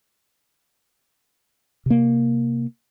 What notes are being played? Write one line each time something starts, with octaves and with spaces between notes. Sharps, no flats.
C3 A#3